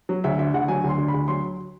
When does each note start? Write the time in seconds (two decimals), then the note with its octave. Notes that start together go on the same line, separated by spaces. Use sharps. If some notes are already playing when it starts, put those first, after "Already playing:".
0.09 F#3
0.24 D2 E5
0.39 D3 E5
0.54 D2 F#5
0.68 F#3 G#5
0.84 D2 C6
0.98 D3
1.08 B5
1.14 D2
1.28 F#3 C6